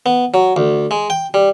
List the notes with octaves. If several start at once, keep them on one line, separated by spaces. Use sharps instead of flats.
B3
F#3
D2
G#3
G5
G3